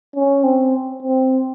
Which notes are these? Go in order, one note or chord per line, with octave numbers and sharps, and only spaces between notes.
C#4
C4
C4